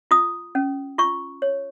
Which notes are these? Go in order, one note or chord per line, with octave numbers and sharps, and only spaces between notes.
F4 D#6
C#4
F4 C#6
C#5